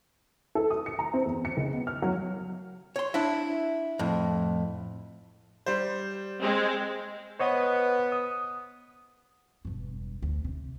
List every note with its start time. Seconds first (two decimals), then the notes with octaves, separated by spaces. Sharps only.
0.55 A4
0.70 D#6
0.86 C#7
0.99 A#5
1.14 C4
1.26 E2
1.45 C#7
1.57 C#2
1.73 B3
1.87 F6
2.02 F#3
2.96 C#5 C6
3.14 D4 E4 E5
3.99 F2 A2
5.66 G3 C5
6.39 G#3 C4
7.39 B3 C5 C#5 D#5
8.12 D#6
9.65 E1 G2
10.22 D2
10.44 C3